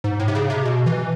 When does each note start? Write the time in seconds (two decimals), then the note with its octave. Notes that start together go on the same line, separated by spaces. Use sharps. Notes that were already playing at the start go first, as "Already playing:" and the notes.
0.04 G#2
0.20 A2
0.28 C3
0.35 C#3
0.50 C3
0.65 B2
0.86 E3